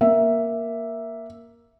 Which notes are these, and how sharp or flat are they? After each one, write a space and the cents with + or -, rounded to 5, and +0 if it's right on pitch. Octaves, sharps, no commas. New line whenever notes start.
A#3 +5 E5 +0